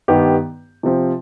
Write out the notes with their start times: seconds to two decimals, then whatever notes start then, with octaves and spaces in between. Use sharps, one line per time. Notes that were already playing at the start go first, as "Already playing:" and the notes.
0.08 G2 D#3 B3 D#4 G4
0.83 C3 F3 C4